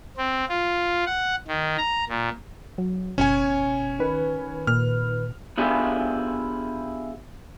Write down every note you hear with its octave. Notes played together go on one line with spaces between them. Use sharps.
C4
F4
F#5
D#3
A#5
A#2
F#3
F#1 B2 C#4 C#5 G#5
D#3 B4
A#2 F6
B3 D4 E4 F4 G4 G#4